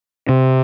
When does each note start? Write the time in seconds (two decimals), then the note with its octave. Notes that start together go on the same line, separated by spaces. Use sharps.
0.29 C3